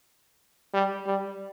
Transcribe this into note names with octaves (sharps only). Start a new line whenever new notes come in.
G3
G3